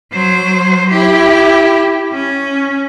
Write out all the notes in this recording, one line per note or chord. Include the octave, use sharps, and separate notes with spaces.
F#3 C5
E4 G4
C#4